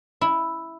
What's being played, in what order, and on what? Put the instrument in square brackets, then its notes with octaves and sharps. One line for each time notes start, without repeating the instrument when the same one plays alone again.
[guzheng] E4